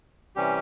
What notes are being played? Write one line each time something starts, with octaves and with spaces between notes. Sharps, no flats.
C3 E3 G3 C#4 G4